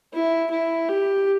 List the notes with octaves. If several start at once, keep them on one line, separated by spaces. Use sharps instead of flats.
E4
E4
G4